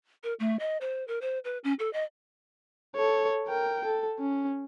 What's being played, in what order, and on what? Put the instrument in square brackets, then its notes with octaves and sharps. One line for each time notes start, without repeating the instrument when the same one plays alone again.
[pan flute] A#4
A3
D#5
C5
A#4
C5
B4
C#4
A4
D#5
[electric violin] A4 C#5
A#4 G5
A4
C#4